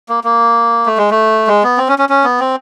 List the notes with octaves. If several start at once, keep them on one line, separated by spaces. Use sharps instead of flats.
A#3
A#3
A3
G#3
A3
G#3
B3
C4
C#4
C#4
C#4
B3
C4